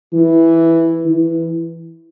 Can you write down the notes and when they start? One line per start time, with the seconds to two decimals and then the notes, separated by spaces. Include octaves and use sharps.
0.13 E3
1.05 E3